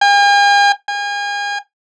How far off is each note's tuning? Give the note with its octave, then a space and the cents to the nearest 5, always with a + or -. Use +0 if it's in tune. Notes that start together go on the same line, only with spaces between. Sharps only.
G#5 -45
G#5 -35